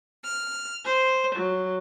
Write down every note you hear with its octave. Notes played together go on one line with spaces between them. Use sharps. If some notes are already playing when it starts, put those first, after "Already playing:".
F6
C5
F#3